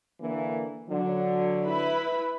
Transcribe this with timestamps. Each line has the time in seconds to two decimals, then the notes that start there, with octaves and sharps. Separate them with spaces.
0.20 D3 E3 A#3
0.90 D3 F#3
1.64 E4 B4 B5